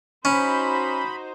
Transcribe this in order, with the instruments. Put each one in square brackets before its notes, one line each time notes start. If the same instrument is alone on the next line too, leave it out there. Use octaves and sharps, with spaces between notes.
[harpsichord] C#4 [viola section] D#4 F#4 C5 [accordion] B5